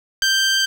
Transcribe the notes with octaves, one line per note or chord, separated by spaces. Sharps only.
G6